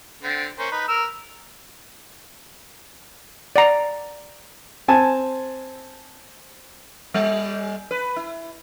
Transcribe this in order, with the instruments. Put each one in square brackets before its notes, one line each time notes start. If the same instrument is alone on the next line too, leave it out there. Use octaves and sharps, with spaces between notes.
[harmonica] D3 C4
A#3 C#4 C5
D#4 B4
A#4 E6
[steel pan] D5 F#5 A#5
[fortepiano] C4 G#5 A5
[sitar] G3
B4
E4